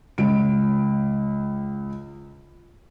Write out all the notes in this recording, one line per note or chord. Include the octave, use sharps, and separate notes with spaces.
C#2 D7